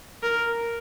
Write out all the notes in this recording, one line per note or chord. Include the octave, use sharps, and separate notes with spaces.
A#4